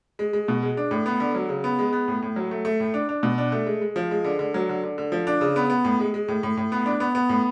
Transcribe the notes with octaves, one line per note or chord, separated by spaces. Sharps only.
G#3
G#3
B2
G#3
D4
A2
B3
D3
F#3
C#3
B3
G#3
B3
A2
A2
F#3
A3
A3
A2
D4
D4
B2
D4
A3
G#3
G#3
F3
G#3
D3
D3
F#3
D3
D3
D3
F3
D4
C#3
B3
B3
A2
G#3
G#3
A2
A2
A2
B3
D4
B3
B3
A2